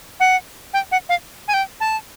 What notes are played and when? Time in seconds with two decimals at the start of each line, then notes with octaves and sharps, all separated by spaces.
0.20 F#5
0.74 G5
0.92 F#5
1.09 F5
1.48 G#5
1.54 G5
1.80 A5